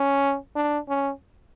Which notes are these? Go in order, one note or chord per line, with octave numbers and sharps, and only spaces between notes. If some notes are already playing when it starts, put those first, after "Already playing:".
Already playing: C#4
D4
C#4